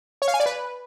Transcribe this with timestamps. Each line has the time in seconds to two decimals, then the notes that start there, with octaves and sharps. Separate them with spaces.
0.22 C#5
0.28 F5
0.34 G#5
0.40 D5
0.46 B4